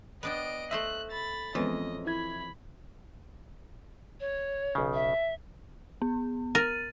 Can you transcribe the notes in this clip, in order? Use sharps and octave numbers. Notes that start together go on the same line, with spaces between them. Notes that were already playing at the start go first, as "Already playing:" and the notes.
B3 D4 D#5 G5 D7
A3 C5 D#5 E5 F#6
B5 A6
F2 E3 G#3 B3 C#4 D#5
E4 B5 G#6
C#5
B1 C#3
E5
B3
A#4 A6 D#7